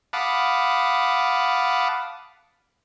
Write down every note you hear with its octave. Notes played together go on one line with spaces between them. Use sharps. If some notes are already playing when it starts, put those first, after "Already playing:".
F5 F#5 A5 B5 D6 D#6